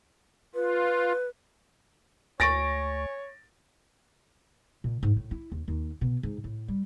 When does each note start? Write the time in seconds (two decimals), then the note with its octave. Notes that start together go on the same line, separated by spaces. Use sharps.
0.55 F4 B4
2.40 D2 C#5 G#5 C#6 A6 A#6 D7
4.84 A#2
5.03 G#2
5.16 A2
5.31 E4
5.52 D#2
5.68 D#2
6.01 B2
6.23 G#2
6.44 A2
6.68 G3